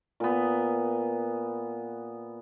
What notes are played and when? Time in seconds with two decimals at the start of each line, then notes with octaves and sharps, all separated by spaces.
0.20 A#2 B3